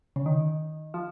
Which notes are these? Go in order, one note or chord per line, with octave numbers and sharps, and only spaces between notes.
C#3
D#3
F3